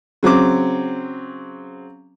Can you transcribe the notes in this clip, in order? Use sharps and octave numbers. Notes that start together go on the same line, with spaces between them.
C#3 F#3 C4 D6